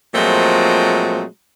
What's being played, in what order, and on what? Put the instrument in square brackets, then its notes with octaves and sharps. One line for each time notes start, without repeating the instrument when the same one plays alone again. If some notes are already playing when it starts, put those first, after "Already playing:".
[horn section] A#2 F3 F#3 G#3 A3 C4